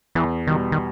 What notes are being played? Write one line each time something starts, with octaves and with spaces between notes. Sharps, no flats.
E2 E3
B2 D#3 G3
D#3